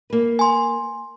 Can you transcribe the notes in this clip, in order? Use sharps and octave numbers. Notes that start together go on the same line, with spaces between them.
A#3 B4
G#5 C6